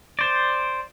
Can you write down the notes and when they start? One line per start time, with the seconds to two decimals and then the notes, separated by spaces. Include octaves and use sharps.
0.19 C5 D5